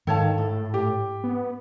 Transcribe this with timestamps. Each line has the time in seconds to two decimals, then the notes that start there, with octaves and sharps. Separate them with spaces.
0.07 G#2 D#3 A4 C#5 F5 G5 A5
0.38 A2 A4
0.74 G4
1.24 B3